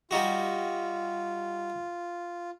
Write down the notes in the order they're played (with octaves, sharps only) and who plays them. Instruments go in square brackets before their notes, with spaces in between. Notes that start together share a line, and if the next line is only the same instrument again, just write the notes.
[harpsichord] G3 D#4 F#4 [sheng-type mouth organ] F4